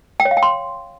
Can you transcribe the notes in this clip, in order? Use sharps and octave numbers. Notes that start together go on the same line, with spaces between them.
G5
C#5
F5
G5
C6